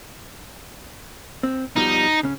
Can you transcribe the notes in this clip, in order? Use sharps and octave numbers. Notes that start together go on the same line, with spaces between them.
C4
B2 F3 G3 D#4
C#3 C#4